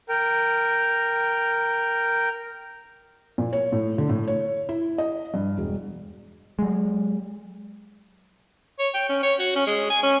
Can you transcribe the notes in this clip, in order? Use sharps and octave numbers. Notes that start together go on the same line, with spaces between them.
A#4 G5
A#2
C#5
A2
D3
A2
C#5
E4
D#5
G2
E1
F#3 G#3
C#5
G5
C#4
C#5
F#4
C#4
G#3
G#5
C#4